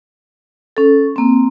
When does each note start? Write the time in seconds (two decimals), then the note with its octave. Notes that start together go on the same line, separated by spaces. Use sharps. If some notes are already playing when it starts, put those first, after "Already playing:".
0.77 C#4 A4
1.16 A#3 C4